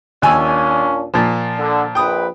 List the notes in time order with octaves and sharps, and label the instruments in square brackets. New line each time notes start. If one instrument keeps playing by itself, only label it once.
[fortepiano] D#2 G#5 E6 [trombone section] A#2 C#4 D4
[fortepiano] A#2 F3
[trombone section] D3
[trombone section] A#1 B4 [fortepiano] G5 D#6